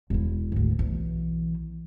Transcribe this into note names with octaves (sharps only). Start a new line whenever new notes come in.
E1 E4
D2 G#2
B1 E3